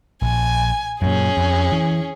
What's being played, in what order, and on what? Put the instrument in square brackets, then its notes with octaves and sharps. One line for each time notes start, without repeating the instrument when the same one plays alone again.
[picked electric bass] A#1 [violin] G#5
[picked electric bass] F#2 A#2 [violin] C#4 G#4
[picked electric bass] F2
E3